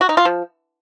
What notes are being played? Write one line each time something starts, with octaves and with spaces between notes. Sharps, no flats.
F#4
D#4
F4
F3